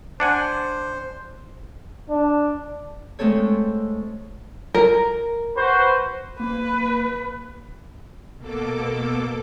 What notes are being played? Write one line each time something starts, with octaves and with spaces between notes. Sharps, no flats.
D4 C5 F#5 G#5
D4
G#3 A3 C4 A4 C#5
A#4
F#4 B4 C5
A#3 B4
B2 A#3 A4 D6